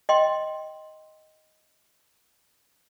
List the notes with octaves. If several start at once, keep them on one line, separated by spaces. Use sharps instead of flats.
D#5 G5 C6